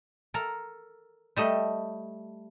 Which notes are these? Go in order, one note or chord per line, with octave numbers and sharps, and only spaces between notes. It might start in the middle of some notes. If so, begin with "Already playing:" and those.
A4 A#4 A#5
G3 A3 D#5